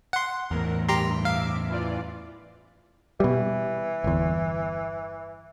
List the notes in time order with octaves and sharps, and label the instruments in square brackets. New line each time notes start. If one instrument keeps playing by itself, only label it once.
[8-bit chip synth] F#5 C6
[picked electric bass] E2 A2 [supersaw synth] A#4
[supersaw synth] G2 [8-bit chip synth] G4 A#5 C6
[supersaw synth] E5 D6 [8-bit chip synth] F5
[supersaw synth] E3 F4 D5
[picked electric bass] B2 G3 [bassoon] E3
[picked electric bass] G1 E2